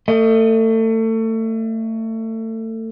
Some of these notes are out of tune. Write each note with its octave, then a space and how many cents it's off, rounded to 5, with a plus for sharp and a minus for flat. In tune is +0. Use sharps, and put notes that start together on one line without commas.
A3 +30 D#5 +0